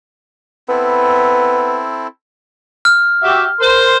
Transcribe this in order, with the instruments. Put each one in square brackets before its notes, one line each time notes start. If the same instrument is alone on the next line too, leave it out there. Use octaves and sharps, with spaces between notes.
[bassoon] B3 [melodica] C4 E4 A4
[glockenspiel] F6
[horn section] F#4 G4 E5
A#4 C5 C6